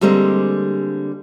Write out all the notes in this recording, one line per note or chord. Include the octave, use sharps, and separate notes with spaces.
D3 G3 G#3 A#3 C4